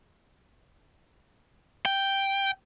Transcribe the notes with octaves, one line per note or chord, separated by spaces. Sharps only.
G5